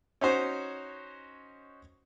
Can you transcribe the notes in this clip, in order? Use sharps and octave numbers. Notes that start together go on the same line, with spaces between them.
C#4 D#4 F#4 C5 C#5